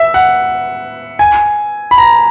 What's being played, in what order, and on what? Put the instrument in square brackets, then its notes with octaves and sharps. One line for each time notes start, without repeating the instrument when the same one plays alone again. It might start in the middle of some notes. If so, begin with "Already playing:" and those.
Already playing: [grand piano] E5
F#5
G#5
B5
A#5